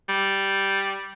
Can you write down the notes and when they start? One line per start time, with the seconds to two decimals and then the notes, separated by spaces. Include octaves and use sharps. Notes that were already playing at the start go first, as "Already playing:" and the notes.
0.09 G3